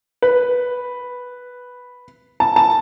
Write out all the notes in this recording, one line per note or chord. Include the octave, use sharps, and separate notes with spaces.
B4
A5
A5